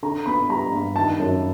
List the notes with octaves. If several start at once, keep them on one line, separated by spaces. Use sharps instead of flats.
D3 A#5
B3 B5
G3 A#5
G2
D#3 A5
F#2